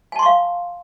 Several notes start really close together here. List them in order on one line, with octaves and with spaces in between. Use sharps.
G#5 A5 C6 C#6 F5